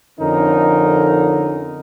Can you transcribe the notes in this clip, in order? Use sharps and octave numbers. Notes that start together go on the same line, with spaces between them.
F2 D3 C#4 D#4 A#4